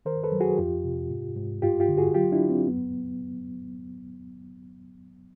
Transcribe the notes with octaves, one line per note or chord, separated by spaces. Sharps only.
D#3 A#4 C5
A4 B4
F#3
F#4 G#4
F2 F4 G4
C3
G#2
G#2
G2 F4 G4
F4 G4
D3
F#4 G#4
F#3 F4 G4
D4 E4
F#3
C4
F#2 B3